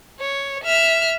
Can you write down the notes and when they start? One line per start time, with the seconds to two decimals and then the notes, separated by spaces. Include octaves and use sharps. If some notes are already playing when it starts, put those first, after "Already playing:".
0.20 C#5
0.64 E5 F6